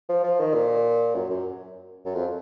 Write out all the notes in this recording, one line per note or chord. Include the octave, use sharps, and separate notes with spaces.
F3
F3
D#3
A#2
F#2
F#2
F#2
F2